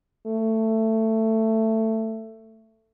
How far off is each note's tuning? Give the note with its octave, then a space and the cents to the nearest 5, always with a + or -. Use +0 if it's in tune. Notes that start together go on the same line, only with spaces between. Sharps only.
A3 +15